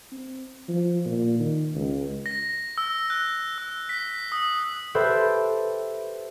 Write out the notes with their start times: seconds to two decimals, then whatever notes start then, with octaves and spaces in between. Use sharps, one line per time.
0.12 C4
0.68 F3
1.05 A#2
1.39 D#3
1.74 C#2
2.26 A#6
2.78 E6
3.10 F#6
3.58 E6
3.89 B6
4.32 D#6
4.95 G4 A4 B4 C5 E5